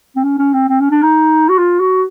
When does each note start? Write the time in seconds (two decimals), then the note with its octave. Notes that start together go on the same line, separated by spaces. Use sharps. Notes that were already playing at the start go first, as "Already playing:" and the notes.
0.16 C4
0.23 C#4
0.38 C#4
0.53 C4
0.68 C4
0.80 C#4
0.91 D4
1.02 D#4
1.49 F#4
1.58 F4
1.80 F#4